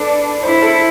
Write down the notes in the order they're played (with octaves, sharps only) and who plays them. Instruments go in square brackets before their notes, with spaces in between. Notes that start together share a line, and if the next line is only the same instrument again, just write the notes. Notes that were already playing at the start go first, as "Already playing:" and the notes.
Already playing: [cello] D4 [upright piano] A4 B4 D5
[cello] E4 [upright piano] C5
[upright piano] A4